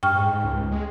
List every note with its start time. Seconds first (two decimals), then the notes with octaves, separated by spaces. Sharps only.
0.03 G2 G5 C#6 F6
0.16 G#2
0.44 C#2
0.71 G#3